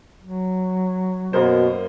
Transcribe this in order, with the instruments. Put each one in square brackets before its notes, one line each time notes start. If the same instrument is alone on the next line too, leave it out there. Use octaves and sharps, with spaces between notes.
[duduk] F#3
[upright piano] F#2 A#3 C5 [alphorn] B2